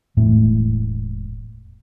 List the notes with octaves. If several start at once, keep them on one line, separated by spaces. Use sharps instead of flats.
E1 A2 A3